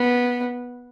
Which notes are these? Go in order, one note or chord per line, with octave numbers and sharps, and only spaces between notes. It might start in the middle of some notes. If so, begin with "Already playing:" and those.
Already playing: B3